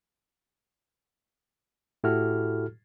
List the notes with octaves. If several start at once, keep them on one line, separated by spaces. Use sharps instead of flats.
A2 E4 F#4 G4 A4 F6